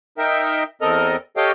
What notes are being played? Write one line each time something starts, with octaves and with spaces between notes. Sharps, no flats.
D#4 A#4 E5 G5
E2 C4 A4 A#4 D#5 F6
G4 A4 C#5 D#5 F5 G5